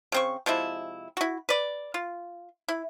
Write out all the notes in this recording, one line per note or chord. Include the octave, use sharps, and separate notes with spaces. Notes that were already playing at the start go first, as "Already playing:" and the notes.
C#3 C4 C#6
C3 F3 G#3 E4
E4 F#4
B4 D5
F4
E4